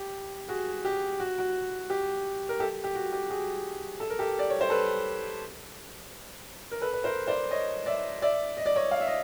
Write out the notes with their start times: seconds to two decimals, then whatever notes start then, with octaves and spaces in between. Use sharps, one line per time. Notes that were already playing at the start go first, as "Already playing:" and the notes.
Already playing: G4
0.48 F#4 G#4
0.85 G4
1.20 F#4
1.38 F#4
1.90 G4
2.49 A#4
2.60 G4 A4
2.84 G4
2.95 F#4
3.13 G4
3.30 F#4 G#4
4.00 A4
4.10 A#4
4.19 G4 A4
4.39 D5
4.50 C#5
4.61 C5
4.70 A4 B4
6.71 A#4
6.82 A4 B4
6.93 B4
7.04 A#4 C5
7.27 C5 D5
7.51 C#5 D#5
7.86 D5 E5
8.22 D5 E5
8.57 D#5
8.66 D5
8.76 C#5 D#5
8.91 F5
9.00 E5
9.07 D#5